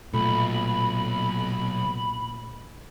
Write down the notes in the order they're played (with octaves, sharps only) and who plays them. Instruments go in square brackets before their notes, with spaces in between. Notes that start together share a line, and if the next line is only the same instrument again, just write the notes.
[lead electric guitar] B1 [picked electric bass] A#2 A3 [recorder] B5